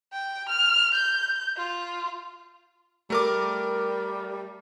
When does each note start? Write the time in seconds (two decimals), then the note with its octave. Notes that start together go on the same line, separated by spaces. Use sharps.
0.12 G5
0.49 F6
0.94 G6
1.56 F4
3.10 G3 A3 A#4 D6